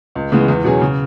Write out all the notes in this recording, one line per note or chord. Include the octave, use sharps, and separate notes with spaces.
C#2
C#3 E3 G#3 B3
E2
B2 F#3 C#4 G#4
C#3